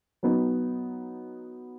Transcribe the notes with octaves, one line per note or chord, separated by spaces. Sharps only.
F#3 B3 D#4